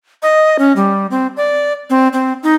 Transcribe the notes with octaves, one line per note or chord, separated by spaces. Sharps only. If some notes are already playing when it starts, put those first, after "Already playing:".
D#5
C#4
G3
C4
D5
C4
C4
D#4